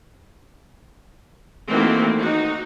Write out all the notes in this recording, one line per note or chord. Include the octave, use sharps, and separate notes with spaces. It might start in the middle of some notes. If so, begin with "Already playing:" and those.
D#3 E3 A3 A#3 C4 F#4
D#4 F#4